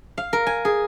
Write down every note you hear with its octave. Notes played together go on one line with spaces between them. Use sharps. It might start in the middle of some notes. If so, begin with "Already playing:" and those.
F5
A#4
G#5
G#4